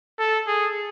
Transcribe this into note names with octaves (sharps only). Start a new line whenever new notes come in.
A4
G#4